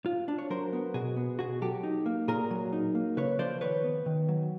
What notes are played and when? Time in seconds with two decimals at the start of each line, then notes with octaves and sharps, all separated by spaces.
0.06 F4
0.28 D4
0.39 C#5
0.50 F#3 A#4 C5
0.73 B3
0.94 B2 F#4 G#4
1.17 B3
1.39 B2 F#4 G#4
1.61 F#3 G4 A4
1.83 D#4
2.06 A#3
2.28 A#2 G#4 A#4
2.51 F#3
2.73 D#4
2.95 A#3
3.17 C#3 B4 C#5
3.39 F3 C5 D5
3.61 D#3 B4 C#5
3.84 B3
4.06 D#3
4.29 F#3